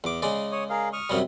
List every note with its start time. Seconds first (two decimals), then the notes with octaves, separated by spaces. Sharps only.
0.04 E2 D6
0.22 C#3 G#3 D5
0.52 C#5 D#6
0.70 G#4 A#4 F5
0.93 C#6 D#6 F6
1.10 F#2 C3 G3